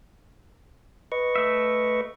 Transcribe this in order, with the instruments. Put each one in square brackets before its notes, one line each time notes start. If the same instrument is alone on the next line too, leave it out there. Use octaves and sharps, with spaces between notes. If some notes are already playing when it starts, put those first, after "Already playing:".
[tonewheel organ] B4 D#5 C#6
[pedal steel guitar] A3 E5